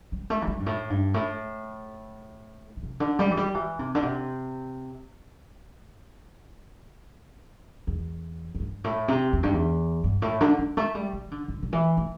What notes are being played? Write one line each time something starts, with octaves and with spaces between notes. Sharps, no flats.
G3
A3
E3
G3
G2
A2
G2
A2
D3
C3
D3
G3
E3
G3
E3
C3
D3
C3
E2
E2
G2
A2
C3
E2
G2
E2
G2
A2
D3
E3
A3
G3
E3
D3
D3
D3
E3
A3